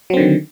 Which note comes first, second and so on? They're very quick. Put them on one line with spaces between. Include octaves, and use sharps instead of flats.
F#3 C4 D3 D#3